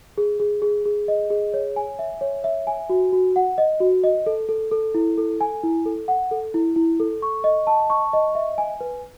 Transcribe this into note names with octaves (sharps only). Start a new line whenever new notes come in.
G#4
G#4
G#4
G#4
D#5
G#4
C#5
G#5
E5
C#5
E5
G#5
F#4
F#4
F#5
D#5
F#4
D#5
A4
A4
A4
E4
A4
G#5
E4
A4
F#5
A4
E4
E4
A4
C#6
D#5
A5
C#6
D#5
E5
G#5
B4